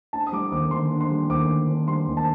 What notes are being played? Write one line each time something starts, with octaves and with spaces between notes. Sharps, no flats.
D4 A5
D#6
G3 D6
D#2 D6
D3 C6
D4
C6
G3
D#2 D6
D3
D4
G3 C6
D#2
A5